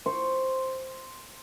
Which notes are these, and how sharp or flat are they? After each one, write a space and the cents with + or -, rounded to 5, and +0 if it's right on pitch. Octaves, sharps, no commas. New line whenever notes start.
C5 +0 C#6 +0